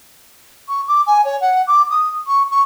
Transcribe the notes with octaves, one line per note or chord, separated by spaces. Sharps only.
C#6
D6
G#5
C#5
F#5
D6
D#6
C#6
C#6